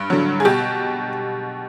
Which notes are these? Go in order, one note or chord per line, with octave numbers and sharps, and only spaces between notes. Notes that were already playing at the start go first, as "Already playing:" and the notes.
Already playing: G2
D3 F#3
G#4
B2 G4